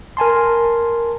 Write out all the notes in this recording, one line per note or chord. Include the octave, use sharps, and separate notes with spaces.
A#4 G#5 A5 C6